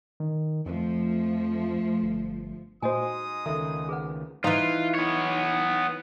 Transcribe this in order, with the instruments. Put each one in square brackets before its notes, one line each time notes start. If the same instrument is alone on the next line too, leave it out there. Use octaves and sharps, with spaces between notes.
[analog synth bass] D#3
[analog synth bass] F2 [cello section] F3 A3
[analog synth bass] G1
[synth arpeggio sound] A#2 C5 [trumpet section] G#3 D#4 D#6 [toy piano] F#4 D#5 G#5
[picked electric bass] C#2 D#3 [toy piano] A4 E5
[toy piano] G#4 B4 F#5
[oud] E3 D#4 [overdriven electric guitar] F4
[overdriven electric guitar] B3 C#5